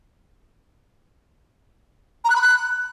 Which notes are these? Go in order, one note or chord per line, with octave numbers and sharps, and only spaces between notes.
A#5
F#6
B5
F#6